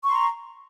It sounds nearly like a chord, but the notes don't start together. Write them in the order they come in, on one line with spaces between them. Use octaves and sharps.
C#6 C6 A#5